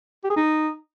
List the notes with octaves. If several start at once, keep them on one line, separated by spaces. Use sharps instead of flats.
G4
G#4
D#4